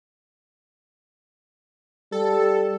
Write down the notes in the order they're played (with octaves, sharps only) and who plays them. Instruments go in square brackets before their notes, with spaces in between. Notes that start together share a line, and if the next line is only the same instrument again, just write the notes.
[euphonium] G3 [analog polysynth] A4